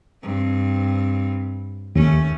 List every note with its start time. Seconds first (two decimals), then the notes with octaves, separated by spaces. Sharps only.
0.22 G2 C4
1.96 D#2 A3 C#4